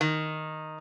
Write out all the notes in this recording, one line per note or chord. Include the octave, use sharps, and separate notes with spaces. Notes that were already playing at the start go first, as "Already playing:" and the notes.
D#3